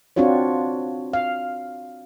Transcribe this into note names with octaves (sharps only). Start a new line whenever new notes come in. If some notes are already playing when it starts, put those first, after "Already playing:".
C4 D4 F4 F#4 C#5
F5